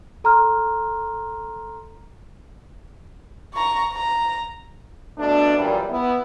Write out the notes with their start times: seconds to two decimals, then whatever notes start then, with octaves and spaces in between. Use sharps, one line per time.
0.24 A4 A#5 C6 F6
3.54 A#5 C#6
3.93 A#5
5.17 B2 A3 D4
5.57 F#2 A#2 E3 G3
5.89 B3 E4